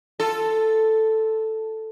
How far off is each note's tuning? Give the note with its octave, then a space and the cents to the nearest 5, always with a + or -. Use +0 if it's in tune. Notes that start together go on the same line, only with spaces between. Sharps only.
F4 +0 A4 +0